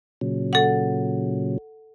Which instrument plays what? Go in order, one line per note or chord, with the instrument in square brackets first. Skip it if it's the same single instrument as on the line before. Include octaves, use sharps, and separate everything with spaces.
[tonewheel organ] A#2 C#3 F#3
[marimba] A4 F#5